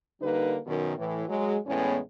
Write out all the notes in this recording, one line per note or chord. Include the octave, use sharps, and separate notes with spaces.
D3 G3 A#3 D#4 B4
F#2 B2 D#3
A2 E3
F#3 G#3
E2 A2 G#3 B3 C#4